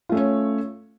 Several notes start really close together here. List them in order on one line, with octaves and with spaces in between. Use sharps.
F4 A3 C#4 C#5